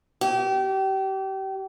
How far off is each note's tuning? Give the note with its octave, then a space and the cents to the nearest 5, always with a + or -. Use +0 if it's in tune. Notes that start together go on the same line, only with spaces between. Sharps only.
G4 -30